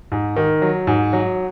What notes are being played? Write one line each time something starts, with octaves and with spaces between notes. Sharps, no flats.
G#2
D#3
F#3
G#2
F#3